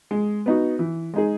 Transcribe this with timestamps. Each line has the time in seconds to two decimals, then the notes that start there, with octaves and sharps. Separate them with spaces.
0.11 G#3
0.46 B3 D#4 F#4
0.79 E3
1.14 G#3 D#4 G#4